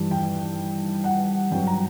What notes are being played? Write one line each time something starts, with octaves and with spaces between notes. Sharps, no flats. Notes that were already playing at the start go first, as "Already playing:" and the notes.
Already playing: G2 E3 G3
G5
F#5
G2 F#3 G5
A#5